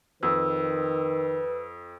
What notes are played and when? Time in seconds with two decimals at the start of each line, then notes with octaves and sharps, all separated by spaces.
0.23 F2 D#3 B4 E6